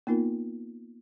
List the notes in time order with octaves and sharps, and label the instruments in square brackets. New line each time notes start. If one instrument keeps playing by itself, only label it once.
[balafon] A#3 B3 D#4 F4 A#4